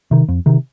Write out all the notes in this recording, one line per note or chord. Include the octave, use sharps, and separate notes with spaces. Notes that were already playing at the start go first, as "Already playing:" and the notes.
C3 D#3
F2
C3 D#3